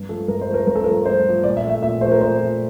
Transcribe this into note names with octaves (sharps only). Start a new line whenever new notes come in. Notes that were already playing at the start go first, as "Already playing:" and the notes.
Already playing: G2
F3 A3 A4
G2 A#4
C5
F3 A3
A#4
G2 A#4
A4
F3 A3 A#4
G2 C5
F3 A3
A#2 D5
E5
F3 A3
E5
A#2 E5
F3 A3 C5
A#4
A#2 C5
F3 A3